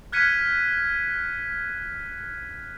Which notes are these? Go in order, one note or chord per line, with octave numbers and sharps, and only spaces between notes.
F6 F#6 G#6 B6 C#7 D#7